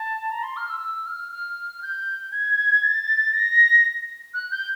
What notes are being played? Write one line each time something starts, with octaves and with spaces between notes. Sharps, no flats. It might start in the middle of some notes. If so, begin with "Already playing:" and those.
Already playing: A5
A#5
C6
F6
E6
E6
F6
F6
G6
G#6
A6
A#6
F#6
G6